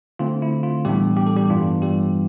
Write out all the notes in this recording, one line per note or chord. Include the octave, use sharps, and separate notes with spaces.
D3 A3 C4 F4
E4
F4
A2 E3 G3 B3 D4 G4
G4
A4
G3 G4
G2 E3 B3 D4 F4
G3 G4